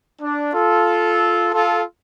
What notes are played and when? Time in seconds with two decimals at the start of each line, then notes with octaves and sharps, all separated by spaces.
0.22 D4
0.54 F4 A4
1.53 F4 A4